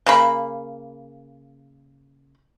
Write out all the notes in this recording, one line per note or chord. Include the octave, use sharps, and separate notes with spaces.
C#3 A#3 B5